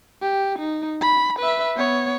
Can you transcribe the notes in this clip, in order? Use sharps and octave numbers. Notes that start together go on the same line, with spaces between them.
G4
D#4
B5
B4 E5
B3 C#5